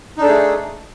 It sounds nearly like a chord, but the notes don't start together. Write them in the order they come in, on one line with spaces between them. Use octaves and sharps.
D#4 D4 A4 G#4 A3